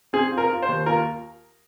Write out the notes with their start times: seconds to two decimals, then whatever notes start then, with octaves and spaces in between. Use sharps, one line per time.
0.13 C4 G#4
0.32 F4
0.38 A#4
0.50 F4
0.62 C5
0.69 D#2
0.86 F4 A#4